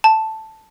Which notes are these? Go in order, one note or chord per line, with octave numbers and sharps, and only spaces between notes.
A5